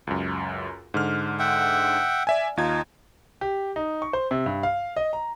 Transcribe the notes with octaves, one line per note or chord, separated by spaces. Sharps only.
C#2 F#2
G#2 D3 F6
E5 F#5 G5
D5 E5 G#5
D#2 D#4 F4 G#6
G4
D#4
C#6
C5
C3
G2
F5
D#5
A#5